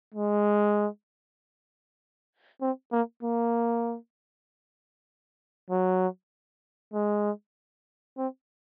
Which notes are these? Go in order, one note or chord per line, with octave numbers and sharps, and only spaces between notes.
G#3
C4
A#3
A#3
F#3
G#3
C4